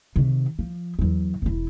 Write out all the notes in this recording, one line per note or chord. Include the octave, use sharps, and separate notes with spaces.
C3 D#3
F3
E2 F#3
E1 E4